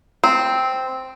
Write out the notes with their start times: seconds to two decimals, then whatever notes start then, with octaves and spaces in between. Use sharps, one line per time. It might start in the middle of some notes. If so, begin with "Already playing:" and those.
0.24 C4